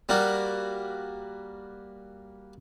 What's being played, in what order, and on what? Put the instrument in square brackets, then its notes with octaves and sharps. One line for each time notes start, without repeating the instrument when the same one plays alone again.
[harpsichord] G3 A#3 F#4